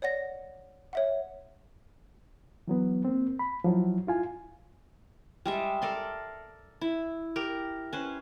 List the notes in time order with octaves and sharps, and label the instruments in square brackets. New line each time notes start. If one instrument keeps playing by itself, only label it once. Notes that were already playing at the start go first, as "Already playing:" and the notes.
[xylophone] C#5 D5 F#5 A#6
C#5 E5 F#5
[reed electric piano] E3 F#3 B3
A#3 C4
B5
F3 F#3 E4
E4 F4 G#5
[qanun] G3 G#3 E5
A4 A#4 D5 C6
E4
G4 A#4
C#4 B4 C5